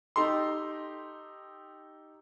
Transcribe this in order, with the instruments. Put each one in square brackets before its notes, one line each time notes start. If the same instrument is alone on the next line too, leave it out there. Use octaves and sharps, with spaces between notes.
[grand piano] D#4 G4 A4 C6